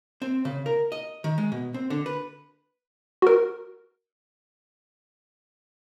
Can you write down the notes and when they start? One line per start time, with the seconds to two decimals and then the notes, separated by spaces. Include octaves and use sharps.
0.22 C4
0.45 C#3
0.66 A#4
0.92 D#5
1.24 D#3
1.38 G#3
1.52 B2
1.74 C4
1.90 D3
2.06 B4
3.22 F#4 A#4